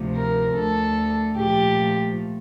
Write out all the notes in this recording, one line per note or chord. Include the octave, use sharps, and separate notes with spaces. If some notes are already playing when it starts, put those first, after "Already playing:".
Already playing: D2 C3 F3 A3
A#4
D2 D3 A3 A4
A#2 F3 A3 G4